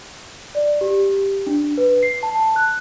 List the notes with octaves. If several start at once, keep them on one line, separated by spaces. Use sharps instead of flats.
D5
G4
D4
B4
C7
A5
F#6